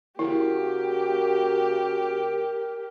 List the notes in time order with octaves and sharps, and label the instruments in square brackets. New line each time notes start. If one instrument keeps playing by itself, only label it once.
[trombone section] C#3 A#3 F#4 [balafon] E4 [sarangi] G4 [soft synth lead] A#4